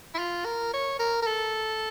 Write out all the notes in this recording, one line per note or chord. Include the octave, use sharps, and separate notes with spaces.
E4
F4
A#4
C#5
A#4
A#4
A4